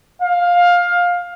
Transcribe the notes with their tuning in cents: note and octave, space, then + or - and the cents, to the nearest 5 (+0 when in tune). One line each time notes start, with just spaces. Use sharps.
F5 +15